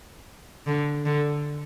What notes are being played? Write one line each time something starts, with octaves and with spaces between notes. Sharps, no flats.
D3
D3